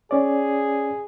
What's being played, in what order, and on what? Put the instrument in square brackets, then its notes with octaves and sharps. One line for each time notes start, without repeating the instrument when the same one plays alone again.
[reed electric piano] C#4 D5 [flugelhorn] G#4